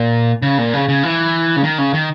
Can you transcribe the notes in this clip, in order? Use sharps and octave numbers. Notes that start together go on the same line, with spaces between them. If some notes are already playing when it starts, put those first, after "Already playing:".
Already playing: A#2
C#3
A#2
C#3
C#3
E3
C#3
D#3
C#3
D#3